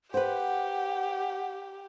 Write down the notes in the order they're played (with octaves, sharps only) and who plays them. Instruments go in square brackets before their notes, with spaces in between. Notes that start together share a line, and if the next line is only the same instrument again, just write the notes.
[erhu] G4 [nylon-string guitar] B4 C5 [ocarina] F#5